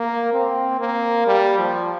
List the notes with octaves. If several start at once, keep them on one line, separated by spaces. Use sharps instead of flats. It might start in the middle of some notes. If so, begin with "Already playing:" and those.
Already playing: A#3
C4
A#3
G3
F3